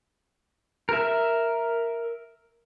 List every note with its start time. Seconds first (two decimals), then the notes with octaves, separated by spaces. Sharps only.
0.89 A#4 E5